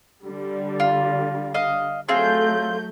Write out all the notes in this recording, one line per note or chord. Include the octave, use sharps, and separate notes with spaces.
D3 G3
F4
D#5 F5
F#3 A3 C4 F4 G#4 G6